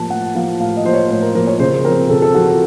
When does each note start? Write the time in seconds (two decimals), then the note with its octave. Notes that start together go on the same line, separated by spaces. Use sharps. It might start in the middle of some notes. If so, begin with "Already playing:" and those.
Already playing: A2 F3 A#3 A5
0.10 A2 F#5
0.35 F3 A#3 F5
0.60 A2 F5
0.77 D#5
0.85 F3 A#3 C5
0.94 C#5
1.10 A2 C5
1.22 A#4
1.35 F3 A#3 A#4
1.47 C#5
1.60 C#3 C5
1.84 F3 C4 A#4
2.10 C#3 A4
2.22 A4
2.34 F3 C4 F#4
2.47 A4